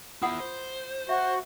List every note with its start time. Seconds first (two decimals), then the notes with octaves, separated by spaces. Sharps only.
0.22 B3 E4 F4 F#5 D#6
0.40 C5
1.09 F#4 E5